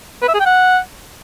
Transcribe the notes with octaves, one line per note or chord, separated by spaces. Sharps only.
B4
E5
G#4
G5
F#5